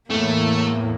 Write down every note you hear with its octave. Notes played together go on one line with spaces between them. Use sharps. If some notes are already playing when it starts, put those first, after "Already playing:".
E2 A2 A3 A#3